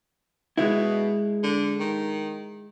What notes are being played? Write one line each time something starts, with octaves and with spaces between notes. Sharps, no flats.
B2 G#3 E4
D3
D#3